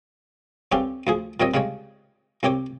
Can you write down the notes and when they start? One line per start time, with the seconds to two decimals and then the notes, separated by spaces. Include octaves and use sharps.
0.72 G2 D3 C4 C#4 G4
1.07 D2 F3 G#4
1.40 A#2 G3 C4 C#5 D#5
1.54 C#3 G3 G#3 C#5
2.43 C2 C4 G4 C#5 D6